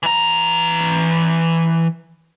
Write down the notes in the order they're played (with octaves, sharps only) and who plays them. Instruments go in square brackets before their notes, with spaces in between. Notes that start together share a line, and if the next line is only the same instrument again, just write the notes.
[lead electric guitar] E3 A#5